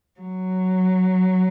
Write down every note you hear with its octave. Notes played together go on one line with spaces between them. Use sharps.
F#3